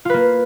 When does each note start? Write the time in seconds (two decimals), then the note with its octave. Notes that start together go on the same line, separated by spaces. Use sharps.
0.05 F4
0.10 B4
0.14 A#3